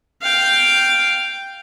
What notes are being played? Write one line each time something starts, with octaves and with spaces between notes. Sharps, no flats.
F5 G5